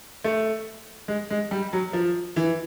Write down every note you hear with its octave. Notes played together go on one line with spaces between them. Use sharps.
A3
G#3
G#3
G3
F#3
F3
E3